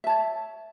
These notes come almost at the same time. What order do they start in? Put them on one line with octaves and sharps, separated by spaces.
E5 A5 C#5